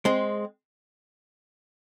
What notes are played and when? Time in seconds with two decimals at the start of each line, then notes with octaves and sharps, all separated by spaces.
0.05 G#3 C4